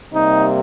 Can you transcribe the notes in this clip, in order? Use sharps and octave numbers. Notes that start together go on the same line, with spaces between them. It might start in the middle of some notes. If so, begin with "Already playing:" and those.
C3 G3 A#3 D#4